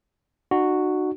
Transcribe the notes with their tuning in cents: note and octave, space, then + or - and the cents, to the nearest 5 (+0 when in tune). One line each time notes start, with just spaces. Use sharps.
D#4 -45 F#4 +0